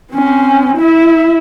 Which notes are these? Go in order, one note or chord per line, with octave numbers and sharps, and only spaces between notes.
C4 C#4
E4 E5